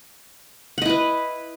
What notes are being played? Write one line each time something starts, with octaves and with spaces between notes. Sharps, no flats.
E4 B4 D#5 F#5